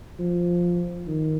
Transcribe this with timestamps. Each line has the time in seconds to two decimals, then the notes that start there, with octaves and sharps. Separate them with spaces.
0.19 F3
1.07 D#3